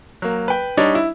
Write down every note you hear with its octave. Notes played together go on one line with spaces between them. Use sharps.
F#3 A#3
B4 G5
G3 D4 D#4 C#5 D5
E4